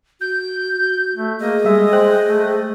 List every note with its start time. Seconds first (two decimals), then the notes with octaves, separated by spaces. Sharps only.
0.21 F#4 G6
1.15 A3
1.40 A#3 G#4 D#5
1.65 G3 G#3 E5
1.93 C5 G5 F#6
2.25 A3